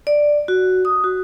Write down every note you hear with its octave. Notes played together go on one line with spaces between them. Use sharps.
D5
F#4
D#6
F#4